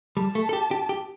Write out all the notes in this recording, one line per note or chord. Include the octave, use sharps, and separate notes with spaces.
G3 A5
A3
A4
G4
G4
G4